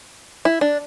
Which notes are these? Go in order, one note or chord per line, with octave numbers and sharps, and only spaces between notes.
E4
D4